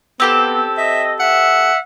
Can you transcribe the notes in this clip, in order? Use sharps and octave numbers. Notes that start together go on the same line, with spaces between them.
B3 C4 G4 A4
D#5 E5
E5 F#5